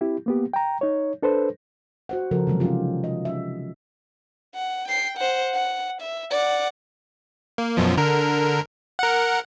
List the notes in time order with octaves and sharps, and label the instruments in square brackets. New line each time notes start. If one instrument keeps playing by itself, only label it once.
[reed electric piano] C4 E4 G4
A#3 B3 G4
G5 A#5
D#4 C#5
D4 A4 B4 C5
[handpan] F#4 C5 F#5
C#3 F3 F#4 A4 A#4
C3 E3 F#3 G#3
G3 C#4 D#4 F4 G4
D#5
C#4 E5
[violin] F#5
G5 C7
C5 F#5
F#5
E5
D5 F#5
[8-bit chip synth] A#3
F#2 B2 F3
D3 A#4
A#4 F#5